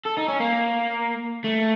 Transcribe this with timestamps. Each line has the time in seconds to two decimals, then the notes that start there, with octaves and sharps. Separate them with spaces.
0.05 A4
0.17 D#4
0.28 C#4
0.40 A#3
1.44 A3